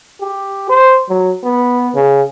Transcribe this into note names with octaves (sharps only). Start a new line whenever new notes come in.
G4
C5
F#3
B3
C#3